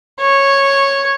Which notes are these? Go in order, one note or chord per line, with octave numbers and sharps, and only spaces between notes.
C#5